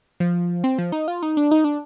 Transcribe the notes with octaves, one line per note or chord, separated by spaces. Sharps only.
F3
C4
F3
D#4
F4
D#4
D4
D#4
D4